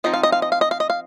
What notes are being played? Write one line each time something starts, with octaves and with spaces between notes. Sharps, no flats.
F3 C4 D#4 D#5
F5
D#5
F5
D#5
F5
D#5
F5
D#5
F5